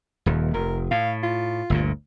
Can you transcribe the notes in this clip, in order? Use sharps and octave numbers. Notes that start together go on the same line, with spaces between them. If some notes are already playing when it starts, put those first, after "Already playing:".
D#1 D#2
F1 A#4
A2 F5
F4
G1 D2 A#2